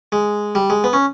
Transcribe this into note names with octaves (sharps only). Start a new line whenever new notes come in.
G#3
G3
G#3
B3
C#4